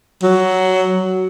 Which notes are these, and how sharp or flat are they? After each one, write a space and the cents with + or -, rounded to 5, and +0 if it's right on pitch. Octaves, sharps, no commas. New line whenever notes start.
F#3 +10